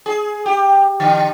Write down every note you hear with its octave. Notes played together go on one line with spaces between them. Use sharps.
G#4
G4
D3